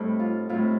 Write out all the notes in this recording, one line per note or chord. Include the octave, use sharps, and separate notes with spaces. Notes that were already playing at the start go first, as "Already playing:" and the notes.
Already playing: A2 G3 C4 D#4 A4
F4
A2 G3 C4 D#4 F4